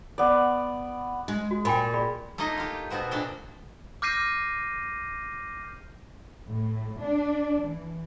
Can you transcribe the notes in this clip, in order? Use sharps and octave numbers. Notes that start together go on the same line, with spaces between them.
B3 D5
G#3
F#4
A#2 G5 G#5 B5
G#4 D5 B5
A3 A#3 D#4 F4 D#5
F4 G4
B2 B3 C4 F#4
A#2 A3 D4 G5
D6 F6 G6 A#6 C7 D#7
A2
D4
E3